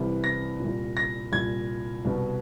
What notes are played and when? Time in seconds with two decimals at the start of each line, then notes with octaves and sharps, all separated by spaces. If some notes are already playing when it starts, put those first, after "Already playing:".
Already playing: C2 C3 E3
0.24 A#6
0.60 C2 A#2
0.97 A#6
1.32 C2 A#2 G#6
2.05 C2 B2